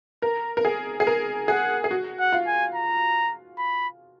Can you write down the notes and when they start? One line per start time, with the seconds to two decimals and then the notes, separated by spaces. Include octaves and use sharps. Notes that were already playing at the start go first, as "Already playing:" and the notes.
0.22 A#4 A#5
0.57 A#4
0.65 G#4
1.00 G#4
1.07 A#4
1.48 G#4 F#5
1.84 G#4
1.91 F#4
2.19 F#5
2.33 F4
2.47 G#5
2.75 A#5
3.58 B5